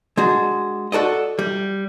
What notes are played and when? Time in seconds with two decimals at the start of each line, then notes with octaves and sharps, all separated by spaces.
0.17 G#3 D4 F#4
0.92 F#4 A4 D5 D#5
1.39 G3